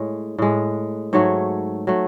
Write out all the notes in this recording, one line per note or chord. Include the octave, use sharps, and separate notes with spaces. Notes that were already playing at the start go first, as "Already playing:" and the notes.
Already playing: A2 G#3 C#5
A2 G#3
G#2 F#3 A3 C#5
F#3 A3